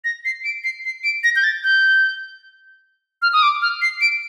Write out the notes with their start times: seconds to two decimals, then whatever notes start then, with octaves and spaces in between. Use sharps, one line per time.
0.05 A#6
0.25 C7
0.44 D7
0.64 C7
0.85 C7
1.04 D7
1.24 A#6
1.36 G6
1.44 A6
1.64 G6
3.22 F6
3.33 D#6
3.42 D6
3.62 F6
3.82 C7
4.01 D7